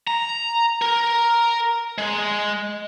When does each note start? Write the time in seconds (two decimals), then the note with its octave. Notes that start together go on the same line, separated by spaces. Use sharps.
0.07 A#5
0.82 A#4
1.98 G#3